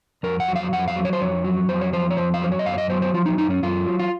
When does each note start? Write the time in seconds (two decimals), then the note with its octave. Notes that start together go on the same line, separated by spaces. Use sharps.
0.23 F2 A#4
0.40 F#5
0.48 F#3
0.56 F5
0.73 F2 F#5
0.88 F5
0.96 F#3
1.05 C#5
1.13 C5
1.21 F2 C#5
1.44 F#3
1.68 F2 C5
1.81 C#5
1.93 F3 C5
2.10 C#5
2.17 F2 C5
2.34 F5
2.41 F#3 C5
2.52 C#5
2.59 D#5
2.66 F#2 F5
2.74 C#5
2.78 D#5
2.90 F#3 C5
3.02 C5
3.14 F3 F4
3.26 D#4
3.38 F#2 D#4
3.50 C#4
3.63 F#2 F4
3.86 F#3
4.00 F4